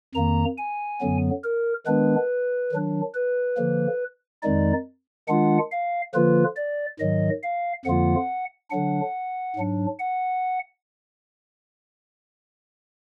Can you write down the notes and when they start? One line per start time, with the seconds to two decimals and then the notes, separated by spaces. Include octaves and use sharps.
0.15 F2 D#3 A#3 A#5
0.58 G#5
1.01 F#2 D3 F#3 B3
1.43 A#4
1.86 D#3 G#3 B3 D4 B4
2.71 D#3 F#3 D4
3.14 B4
3.57 D3 F3 A#3
4.43 F2 D#3 G#3 D#4 D5
5.28 D#3 G#3 D4 F4 F#5
5.71 F5
6.14 D3 F3 A#3 F4 B4
6.56 D5
6.99 G#2 D#3 F#3 D#5
7.43 F5
7.85 F2 D3 F3 A#3 F4 F#5
8.71 D3 F#3 D4 F#5
9.56 G#2 F#3 D4
9.99 F#5